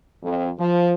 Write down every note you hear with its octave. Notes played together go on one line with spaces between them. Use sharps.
F2
F3